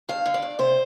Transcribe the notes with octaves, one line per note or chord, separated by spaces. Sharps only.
G2 F5
D3
D5
G2
C3 C5